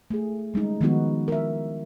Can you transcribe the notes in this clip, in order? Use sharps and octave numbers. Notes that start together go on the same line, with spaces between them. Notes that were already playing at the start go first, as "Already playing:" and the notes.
A3 G#4
G3 G#3 C#4 D#4
D#3 F3 G#3 B3 D#4 F#4
A#4 E5